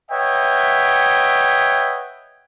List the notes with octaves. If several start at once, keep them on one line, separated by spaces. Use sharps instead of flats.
B4 C#5 D#5 E5 F#5 G5